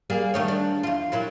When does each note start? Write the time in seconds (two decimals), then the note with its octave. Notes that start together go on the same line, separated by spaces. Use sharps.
0.10 G3 A#3 G#4
0.34 D#3 A3 C#5
0.48 D4
0.83 E2 F4
1.12 A#2 F#3 E4